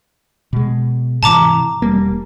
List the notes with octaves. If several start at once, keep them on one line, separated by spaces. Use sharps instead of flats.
B2 G#3
G#2 C3 E3 A5 A#5 D6
E1 G3 A#3